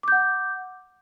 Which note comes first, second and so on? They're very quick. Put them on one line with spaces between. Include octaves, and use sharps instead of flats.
D6 G6 F#5